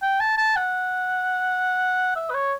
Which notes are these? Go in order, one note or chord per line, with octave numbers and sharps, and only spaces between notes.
G5
A5
A5
F#5
E5
B4
C#5